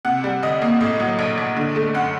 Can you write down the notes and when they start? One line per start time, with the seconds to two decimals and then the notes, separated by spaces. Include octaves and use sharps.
0.05 C3 F#5
0.24 G3
0.43 D2 D#5
0.62 A#3
0.81 A2 D#5
1.00 F#3
1.19 A#1
1.38 A#1
1.56 D3
1.76 A3
1.94 F#2 F#5